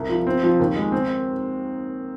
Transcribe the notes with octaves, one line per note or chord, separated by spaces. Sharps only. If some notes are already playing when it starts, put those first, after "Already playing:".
Already playing: C2
F3
C4
F3
D#2
G#3
C4